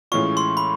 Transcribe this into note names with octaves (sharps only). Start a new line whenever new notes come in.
A2 E3 G#3 C#4 F4 C#6
C6
B5